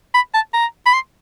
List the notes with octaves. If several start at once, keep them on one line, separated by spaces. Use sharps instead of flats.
B5
A5
A#5
B5
C6